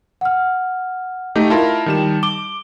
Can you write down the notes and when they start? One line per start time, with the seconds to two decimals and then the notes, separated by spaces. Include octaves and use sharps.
0.21 F#5 F6
1.35 A3 D#4 G4
1.50 E4 F4 A#4 A5
1.86 D#3 G3 E7
2.23 D6 G7